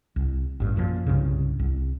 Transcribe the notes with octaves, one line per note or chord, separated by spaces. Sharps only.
C2
A1 G2
F#2 A#2 D#3 F3
C2 G2 C#3
C2